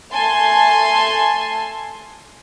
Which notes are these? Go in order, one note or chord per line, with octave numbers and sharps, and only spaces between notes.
A3 G#5 A5 C6